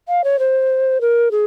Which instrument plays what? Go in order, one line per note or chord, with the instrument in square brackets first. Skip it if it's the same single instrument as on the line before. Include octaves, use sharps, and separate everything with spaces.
[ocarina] F5
C#5
C5
A#4
G#4